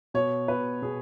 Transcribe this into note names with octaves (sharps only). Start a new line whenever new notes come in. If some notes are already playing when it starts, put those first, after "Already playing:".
B2 C#5
B2 B4
B2 G#4